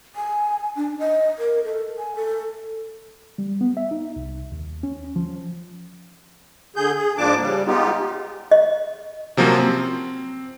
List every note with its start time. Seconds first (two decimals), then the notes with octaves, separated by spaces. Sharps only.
0.16 G#5
0.76 D4
0.99 D#5
1.39 A#4
1.65 A4
1.98 G#5
2.15 A4
3.38 G3
3.61 B3
3.77 E5
3.91 D#4
4.16 C2
4.52 D#2
4.83 C#4
5.16 F3
6.76 D3 G#4 G6
6.96 G#4
7.17 G#2 F3 A#3 D4 A5 D6
7.40 C#3 G3
7.66 G#3 B3 D#4 F4 G4
8.51 D#5
9.37 C3 F3 F#3 A#3 C#4
9.60 C4